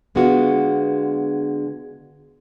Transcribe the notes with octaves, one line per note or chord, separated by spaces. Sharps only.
D3 G#3 B3 F4 F#4